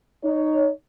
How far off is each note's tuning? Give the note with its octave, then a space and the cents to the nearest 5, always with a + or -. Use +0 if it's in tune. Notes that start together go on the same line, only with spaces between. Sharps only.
D#4 -10 C#5 +15